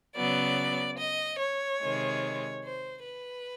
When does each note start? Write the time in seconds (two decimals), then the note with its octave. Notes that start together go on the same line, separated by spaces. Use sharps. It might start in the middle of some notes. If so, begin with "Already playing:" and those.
0.16 C#3 F#3 B3 D5
0.99 D#5
1.40 C#5
1.81 C3 D#3 G#3
2.64 C5
3.04 B4